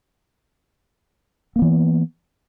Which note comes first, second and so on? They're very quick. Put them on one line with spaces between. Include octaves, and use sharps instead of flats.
A#3 B3 E3